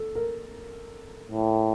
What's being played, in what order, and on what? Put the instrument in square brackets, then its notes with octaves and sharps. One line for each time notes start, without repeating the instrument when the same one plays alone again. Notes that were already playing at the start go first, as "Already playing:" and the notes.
Already playing: [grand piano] A4
A#4
[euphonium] A2